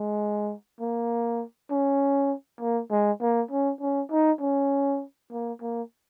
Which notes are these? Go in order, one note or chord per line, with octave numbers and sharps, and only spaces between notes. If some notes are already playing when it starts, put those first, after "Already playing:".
Already playing: G#3
A#3
C#4
A#3
G#3
A#3
C#4
C#4
D#4
C#4
A#3
A#3